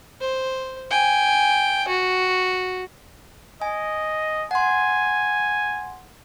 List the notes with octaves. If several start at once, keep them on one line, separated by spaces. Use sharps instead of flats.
C5
G5 G#5
F#4
D#5 G#5
F#5 G#5 C6